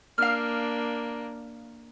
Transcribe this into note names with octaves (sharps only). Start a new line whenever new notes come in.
A#3 D4 F5 F6